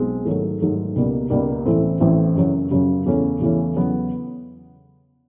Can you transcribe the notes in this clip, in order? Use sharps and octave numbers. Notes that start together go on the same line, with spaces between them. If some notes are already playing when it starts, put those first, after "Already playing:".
Already playing: B1 B2 G#3 C4
G#2 D#3 F#3 A3
G#2 D#3 F#3 A3
C#2 B2 G3 A#3 D#4
C#2 B2 G3 A#3 D#4
A1 A2 E3 A3 C4
A1 A2 E3 A3 C4
F#2 C#3 F#3
F#2 C#3 F#3
E2 C#3 E3 A3 C#4
E2 C#3 E3 A3 C#4
E2 C#3 F#3 B3